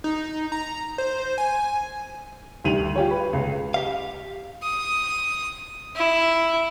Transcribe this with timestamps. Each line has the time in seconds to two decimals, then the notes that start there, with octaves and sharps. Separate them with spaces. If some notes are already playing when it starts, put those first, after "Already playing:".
0.04 D#4
0.52 A#5
0.98 C5
1.38 G#5
2.64 D2 D#3 G3 D#7 F7 F#7
2.96 F4 G4 C#5
3.11 B4
3.33 C#2
3.74 G4 F5
4.63 D#6
5.96 E4